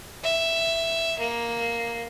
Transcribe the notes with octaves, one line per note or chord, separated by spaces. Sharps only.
E5
A#3